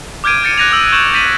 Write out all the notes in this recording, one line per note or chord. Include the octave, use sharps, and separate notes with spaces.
D6 F6 G6 G#6 D7 D#7
G6 A6 C#7 D#7
F#6 G#6 A#6 D#7 F7
D#6 E6 F#7
C#6 G6 E7 F#7
G6 A6 B6 D#7 F#7